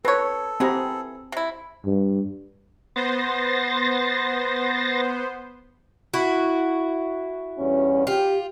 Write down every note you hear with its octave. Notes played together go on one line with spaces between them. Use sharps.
C4 A4 B4 C#5
E3 B3 C4 G4 G#4 A#5
C3 E4
G2
B3 C5 C6 A6 A#6
E4 F#4
E2 G2 C#4
F4 G4